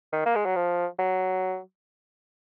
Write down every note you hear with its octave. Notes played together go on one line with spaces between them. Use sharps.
D#3
A#3
G#3
F#3
F3
F#3